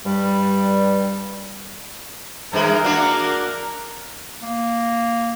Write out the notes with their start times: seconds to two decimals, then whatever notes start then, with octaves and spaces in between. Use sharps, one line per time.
0.05 G2 G3
2.53 G2 E3 G#3 A#4
2.84 A#3 D4 F#4
4.42 A#3